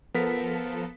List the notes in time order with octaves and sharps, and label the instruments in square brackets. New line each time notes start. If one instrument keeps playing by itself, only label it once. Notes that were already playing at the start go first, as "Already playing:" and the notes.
[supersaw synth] F3 A4 [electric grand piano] B3 A#4 B6